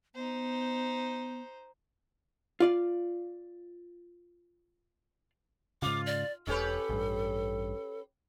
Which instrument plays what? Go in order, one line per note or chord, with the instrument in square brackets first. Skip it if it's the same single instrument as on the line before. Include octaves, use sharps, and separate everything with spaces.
[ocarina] B3 [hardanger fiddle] D#4 C5
[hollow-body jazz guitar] F4 D5 F5
[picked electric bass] G#2 C#3 [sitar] F4 [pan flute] D6
[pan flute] D5
[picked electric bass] E1 [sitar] C#4 G4 B4 [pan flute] A4
[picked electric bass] A1 G2